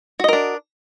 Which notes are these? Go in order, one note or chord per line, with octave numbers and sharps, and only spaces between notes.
D4 F#4 A#4 D#5